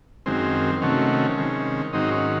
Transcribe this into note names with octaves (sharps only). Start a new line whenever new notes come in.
F#2 D#3 G#3 C4
C3 D#3 F#3 A3 C#4
C3 D#3 G#3
G#2 D#3 F#3 C4 D#4
C#4